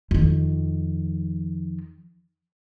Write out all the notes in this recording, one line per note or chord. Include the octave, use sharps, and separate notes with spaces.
F2 D#3